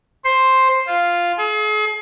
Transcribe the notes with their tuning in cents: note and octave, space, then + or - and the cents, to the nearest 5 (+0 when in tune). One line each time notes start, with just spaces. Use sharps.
C5 +5
F4 -5
G#4 +40